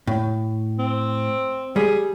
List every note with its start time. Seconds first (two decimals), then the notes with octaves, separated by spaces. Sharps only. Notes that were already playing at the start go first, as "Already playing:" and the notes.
0.07 A2
0.79 C4
1.76 G3 G#4